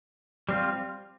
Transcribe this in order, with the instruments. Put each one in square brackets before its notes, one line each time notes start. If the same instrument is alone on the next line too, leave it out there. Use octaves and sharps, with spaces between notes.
[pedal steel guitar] G3 C4 F4